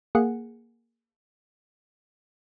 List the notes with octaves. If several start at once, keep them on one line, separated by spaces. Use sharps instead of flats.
A#3 G#4 F#5 C#7